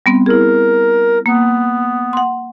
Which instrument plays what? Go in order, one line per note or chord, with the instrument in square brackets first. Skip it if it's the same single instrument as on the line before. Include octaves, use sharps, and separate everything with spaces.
[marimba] G3 B3 C4
[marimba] E4 G#4 [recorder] A#4
[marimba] A#3 [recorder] B3
[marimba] F#5 C6